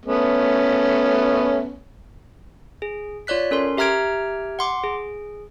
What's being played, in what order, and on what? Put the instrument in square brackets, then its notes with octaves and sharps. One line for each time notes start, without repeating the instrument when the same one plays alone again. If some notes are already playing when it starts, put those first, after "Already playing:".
[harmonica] A3 B3 C#4
[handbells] G#4
F4 C#5 D5 F#6 B6
C#4 A4 A#4 C6
G4 E5 A#5 F6 G#6 D7
F#5 C6 D6
G#4